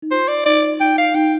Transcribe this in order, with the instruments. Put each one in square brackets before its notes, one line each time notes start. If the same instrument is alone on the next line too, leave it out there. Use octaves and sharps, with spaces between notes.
[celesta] D#4
[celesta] F4 [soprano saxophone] C5
[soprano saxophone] D5
[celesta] D#4 [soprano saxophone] D5
[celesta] D#4 [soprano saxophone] G5
[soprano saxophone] F5
[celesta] D#4 [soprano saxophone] G5